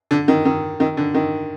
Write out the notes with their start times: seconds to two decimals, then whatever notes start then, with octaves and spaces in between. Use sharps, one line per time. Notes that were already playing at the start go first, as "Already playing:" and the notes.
0.11 D3
0.28 D#3
0.45 D#3
0.80 D#3
0.97 D3
1.14 D#3